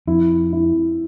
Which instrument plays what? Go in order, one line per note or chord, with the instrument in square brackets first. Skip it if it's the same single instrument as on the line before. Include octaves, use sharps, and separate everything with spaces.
[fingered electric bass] F2 [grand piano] E4
[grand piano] E4